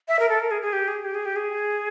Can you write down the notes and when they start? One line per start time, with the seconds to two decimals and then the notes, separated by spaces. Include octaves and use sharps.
0.08 E5
0.19 A#4
0.29 A4
0.40 A#4
0.51 G#4
0.62 G#4
0.73 G4
0.88 G#4
1.05 G4
1.15 G#4
1.26 G4
1.36 G#4